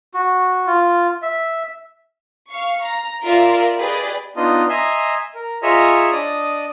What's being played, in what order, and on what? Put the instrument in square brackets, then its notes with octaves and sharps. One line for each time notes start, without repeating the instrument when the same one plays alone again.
[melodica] F#4
F4
E5
[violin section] F5 C#6
A#5
F4 A#4 D5 E5
G4 G#4 B4 D5 D#5 B5
[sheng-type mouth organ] B3 D4 D#4 F4 D#5
D#5 E5 G#5 A#5 C6
A#4
F4 G#4 C#5 D#5 E5 A#5
D4 D5 D#5 D#6